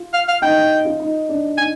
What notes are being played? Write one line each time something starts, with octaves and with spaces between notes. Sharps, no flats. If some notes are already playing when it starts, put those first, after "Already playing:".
Already playing: F4
F5
F5
D#4 G5
D#4
F4
D#4
D4
D#4 G#5